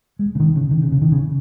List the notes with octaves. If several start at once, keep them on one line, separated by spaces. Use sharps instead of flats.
G#3
C#3
D#3
C#3
D#3
C#3
C#3
D#3
C#3